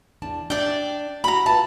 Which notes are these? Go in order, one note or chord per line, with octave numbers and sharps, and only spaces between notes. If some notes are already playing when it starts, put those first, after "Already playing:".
E2 D4 A5
D4 D5 E5 G5
E4 F#4 A#5 B5
F4 B4 E5 A5